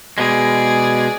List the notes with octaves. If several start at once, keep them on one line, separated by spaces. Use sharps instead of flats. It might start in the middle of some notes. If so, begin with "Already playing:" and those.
B2 G#3 G#4 D5